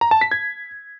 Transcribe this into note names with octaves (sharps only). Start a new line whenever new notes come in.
A#5
A5
B6
G#6